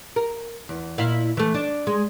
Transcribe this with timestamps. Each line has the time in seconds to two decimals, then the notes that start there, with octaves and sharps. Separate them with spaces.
0.16 A#4
0.69 E2
0.98 A#2 E4 F5
1.37 E3 A3
1.54 D4
1.87 G#3